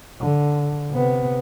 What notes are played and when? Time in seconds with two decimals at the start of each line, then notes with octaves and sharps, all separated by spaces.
0.21 D3
0.91 C3 B3